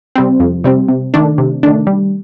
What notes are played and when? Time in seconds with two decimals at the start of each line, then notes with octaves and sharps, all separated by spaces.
0.15 C3 G3 C4
0.40 F2
0.64 C3 G3 C4
0.88 C3
1.14 D#3 A3 D4
1.38 C3
1.63 D#3 A3 D4
1.87 G3